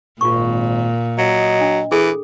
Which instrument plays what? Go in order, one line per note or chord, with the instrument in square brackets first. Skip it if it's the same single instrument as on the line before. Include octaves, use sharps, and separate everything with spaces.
[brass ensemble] G#1 [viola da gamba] A#2 [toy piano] F4 C#6
[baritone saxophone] F#3 [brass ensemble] D#5
[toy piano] D4
[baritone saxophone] E3 [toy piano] G#4 A4